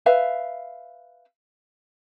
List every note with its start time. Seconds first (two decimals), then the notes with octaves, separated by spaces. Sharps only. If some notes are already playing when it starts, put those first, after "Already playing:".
0.06 B4 E5 F5